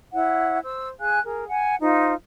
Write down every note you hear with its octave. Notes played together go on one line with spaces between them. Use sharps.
E4 C#5 F#5
C5 E6
G#4 F5 G#5 F#6
G#4 A#4
F#5 G#5
D#4 F4 C5